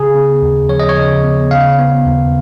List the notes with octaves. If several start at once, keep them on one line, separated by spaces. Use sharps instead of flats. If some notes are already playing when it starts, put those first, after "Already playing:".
Already playing: C#3 G#4
B3
D#2
F3 C#5
D#5
C#5
C#3
B3
C#3 F5
B3
D#2